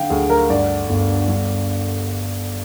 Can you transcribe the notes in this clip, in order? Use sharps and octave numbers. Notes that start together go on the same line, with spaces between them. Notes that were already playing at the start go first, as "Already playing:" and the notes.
Already playing: D3 F5 G5
D2 G#4
A#4
G2 D5
G1
G2